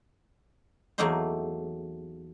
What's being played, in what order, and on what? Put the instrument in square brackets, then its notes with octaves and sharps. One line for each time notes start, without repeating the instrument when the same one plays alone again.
[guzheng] E2 F#3 A3 A#3 D#4 C5